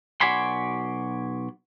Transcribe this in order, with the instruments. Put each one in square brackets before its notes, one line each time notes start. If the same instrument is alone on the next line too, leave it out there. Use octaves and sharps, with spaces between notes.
[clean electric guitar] B1 F#4 D5 G#5 B5 C6